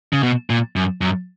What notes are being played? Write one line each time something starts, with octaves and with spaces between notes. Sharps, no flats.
C#3
B2
A#2
F#2
F#2